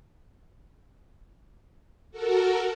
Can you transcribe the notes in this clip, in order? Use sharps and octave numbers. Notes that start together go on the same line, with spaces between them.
F#4 A4 A#4